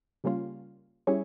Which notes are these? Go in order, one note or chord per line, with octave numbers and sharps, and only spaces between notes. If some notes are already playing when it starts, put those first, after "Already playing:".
C#3 G3 A#3 C#4 F4
G3 C#4 E4 G#4 C#5